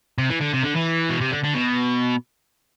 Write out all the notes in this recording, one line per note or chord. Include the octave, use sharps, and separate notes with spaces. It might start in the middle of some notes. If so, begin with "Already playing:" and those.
C3
E3
D3
C3
D3
E3
B2
C3
D3
D3
B2